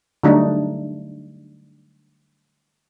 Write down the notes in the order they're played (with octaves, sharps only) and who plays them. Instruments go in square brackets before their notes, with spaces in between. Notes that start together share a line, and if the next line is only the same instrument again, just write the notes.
[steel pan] D3 F#3 G3 A3 D4 D#4